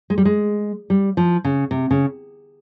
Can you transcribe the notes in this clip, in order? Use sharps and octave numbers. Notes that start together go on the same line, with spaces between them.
G#3
G3
G#3
G3
F3
C#3
C3
C#3